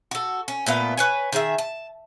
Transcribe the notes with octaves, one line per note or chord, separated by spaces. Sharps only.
F#4 A4
C#4
A#2 A3 B3 F5
B4 C#5 G#5
D#3 G#4 C5 E5
A5